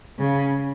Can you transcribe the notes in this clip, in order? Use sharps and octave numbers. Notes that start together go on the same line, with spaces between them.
C#3